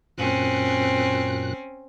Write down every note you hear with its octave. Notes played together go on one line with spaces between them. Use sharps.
F#2 A#2 C4 C#4 F#6